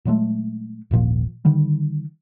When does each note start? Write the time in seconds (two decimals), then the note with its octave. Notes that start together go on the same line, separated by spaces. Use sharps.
0.05 A#2 F#3 G#3 A3
0.91 D#1 G#1 A#2 F3
1.45 D3 D#3 G3